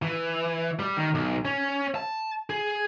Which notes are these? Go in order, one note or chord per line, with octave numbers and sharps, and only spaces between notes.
E3
G3
D#3
B1
C#4
A5
G#4